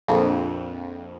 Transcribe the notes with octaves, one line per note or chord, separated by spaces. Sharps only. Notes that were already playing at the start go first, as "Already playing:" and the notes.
A#1 F2